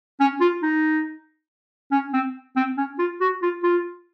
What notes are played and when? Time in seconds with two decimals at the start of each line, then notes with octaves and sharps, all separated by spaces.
0.20 C#4
0.41 F4
0.63 D#4
1.92 C#4
2.13 C4
2.56 C4
2.78 C#4
2.99 F4
3.21 F#4
3.42 F4
3.64 F4